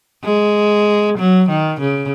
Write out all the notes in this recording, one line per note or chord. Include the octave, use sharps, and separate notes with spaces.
G#3
F#3
D#3
C#3